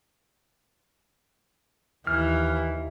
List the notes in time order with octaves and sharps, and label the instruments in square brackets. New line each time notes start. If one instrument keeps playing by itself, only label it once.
[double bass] D#2 D#3 [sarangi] E3 [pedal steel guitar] F6